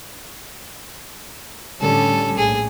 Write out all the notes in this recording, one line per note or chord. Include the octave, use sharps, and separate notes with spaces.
A2 D3 G3 C#4 A4
A#1 A2 G#4